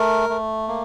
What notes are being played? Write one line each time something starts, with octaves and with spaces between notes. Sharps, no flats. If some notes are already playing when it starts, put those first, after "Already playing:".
Already playing: A3 A#4
A3
A#3